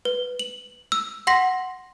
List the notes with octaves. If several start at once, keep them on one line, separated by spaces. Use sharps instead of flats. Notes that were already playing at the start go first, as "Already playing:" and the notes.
B4
F#7
E6
F#5 C6 A#6 B6